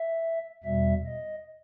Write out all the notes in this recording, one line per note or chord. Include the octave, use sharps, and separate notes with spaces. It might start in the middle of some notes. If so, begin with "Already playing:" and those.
Already playing: E5
E2 B2 G3 E5
D#5